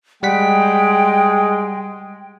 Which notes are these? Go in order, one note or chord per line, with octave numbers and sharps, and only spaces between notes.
G3 G#3 F#5 G5 B6